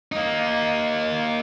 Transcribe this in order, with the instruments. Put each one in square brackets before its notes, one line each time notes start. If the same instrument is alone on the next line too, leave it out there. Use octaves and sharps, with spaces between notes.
[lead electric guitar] A#3 D#4